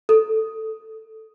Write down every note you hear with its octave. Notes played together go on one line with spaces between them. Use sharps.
A4